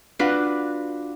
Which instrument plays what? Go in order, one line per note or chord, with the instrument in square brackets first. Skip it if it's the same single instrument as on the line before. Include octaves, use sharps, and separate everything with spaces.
[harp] D4 F4 F#4 B4